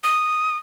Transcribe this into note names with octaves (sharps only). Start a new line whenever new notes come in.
D#6